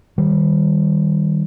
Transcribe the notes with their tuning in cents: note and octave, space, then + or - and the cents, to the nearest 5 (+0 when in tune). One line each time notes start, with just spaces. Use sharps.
D#3 +0 G3 +0